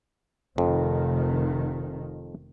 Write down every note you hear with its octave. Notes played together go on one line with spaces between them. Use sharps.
F1 F2 D#3